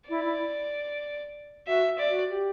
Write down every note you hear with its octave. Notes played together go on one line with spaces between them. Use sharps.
E4 D5
E4
F#4 E5
D5
F#4
G4